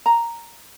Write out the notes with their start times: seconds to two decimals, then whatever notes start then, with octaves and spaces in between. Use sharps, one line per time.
0.06 A#5